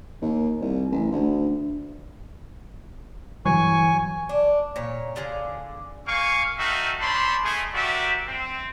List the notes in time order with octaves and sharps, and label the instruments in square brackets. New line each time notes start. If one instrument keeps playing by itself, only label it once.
[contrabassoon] D#2
C2
A1
D2
[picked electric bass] G1 E3 F#3 [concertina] G#5 C#6
[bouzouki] D4
A#2 C#5
D3 F4 G#4 G#5
[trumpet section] A#3 F5 G#5 C#6
D#4 F#4 A4 E5 F5 G5
D4 C5 C#5 A5 B5 C6
G#3 A3 G#4
F#4 G4 A#4 D5 E5
C4